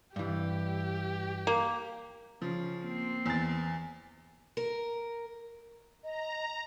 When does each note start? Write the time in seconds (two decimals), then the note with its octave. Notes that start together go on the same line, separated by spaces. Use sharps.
0.16 G2 E3 G4
1.47 A#3
2.42 C#3 F3
2.83 A#3 C4
3.26 E2 A6
4.57 A#4
6.04 D#5 A#5